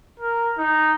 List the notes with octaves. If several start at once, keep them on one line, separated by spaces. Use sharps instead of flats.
A#4
D#4